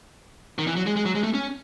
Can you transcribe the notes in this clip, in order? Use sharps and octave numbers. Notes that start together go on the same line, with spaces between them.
D#3
E3
F#3
G#3
G#3
F#3
G#3
A3
C#4